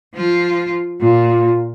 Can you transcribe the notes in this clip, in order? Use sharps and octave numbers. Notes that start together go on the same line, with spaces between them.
F3 F4
A#2 F4